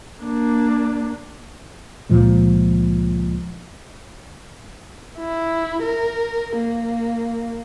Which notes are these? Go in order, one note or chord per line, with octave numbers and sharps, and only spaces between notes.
A#3 D4
C#2 A#2 F3 G#3
E4
A#4
A#3